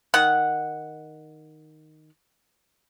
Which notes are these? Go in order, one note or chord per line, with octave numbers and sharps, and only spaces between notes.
D#3 F#5